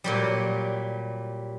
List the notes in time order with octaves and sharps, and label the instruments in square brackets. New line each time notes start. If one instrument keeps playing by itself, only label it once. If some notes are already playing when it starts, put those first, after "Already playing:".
[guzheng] A#2 F#3 G3